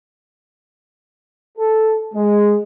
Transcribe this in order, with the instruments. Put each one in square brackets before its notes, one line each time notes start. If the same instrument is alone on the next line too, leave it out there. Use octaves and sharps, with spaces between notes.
[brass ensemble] A4
G#3